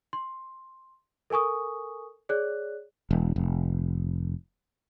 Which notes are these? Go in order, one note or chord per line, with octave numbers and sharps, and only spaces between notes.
C6
A4 A#4 G#5 C#6 D#6
G#4 C#5 D5 F#6
E1
F1